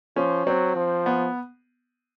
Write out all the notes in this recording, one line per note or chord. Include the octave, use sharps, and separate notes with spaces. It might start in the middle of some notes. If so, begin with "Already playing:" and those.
F3 C#4
F#3 C4
F3
B3